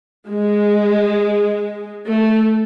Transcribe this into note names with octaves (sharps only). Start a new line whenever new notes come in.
G#3
A3